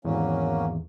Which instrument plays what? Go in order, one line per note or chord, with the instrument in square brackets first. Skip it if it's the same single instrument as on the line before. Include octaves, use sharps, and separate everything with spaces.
[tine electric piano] G#1 E2 [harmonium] F#3 A#3 C#4